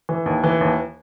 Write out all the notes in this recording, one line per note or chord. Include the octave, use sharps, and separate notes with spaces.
E3
D#2
E3
D#2